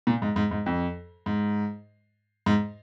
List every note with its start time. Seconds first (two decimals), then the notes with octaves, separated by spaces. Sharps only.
0.07 A#2
0.22 G#2
0.36 G#2
0.51 G#2
0.66 F2
1.26 G#2
2.46 G#2